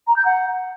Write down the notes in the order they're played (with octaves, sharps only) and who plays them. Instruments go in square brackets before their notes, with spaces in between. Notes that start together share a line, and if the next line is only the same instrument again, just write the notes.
[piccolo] A#5
G6
F#5